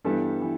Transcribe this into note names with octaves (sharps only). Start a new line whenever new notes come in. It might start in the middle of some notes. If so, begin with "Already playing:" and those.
G2 E3 G3 B3 A4
E3